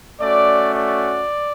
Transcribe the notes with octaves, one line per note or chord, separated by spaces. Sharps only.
A3 C#4 F#4 D5
D5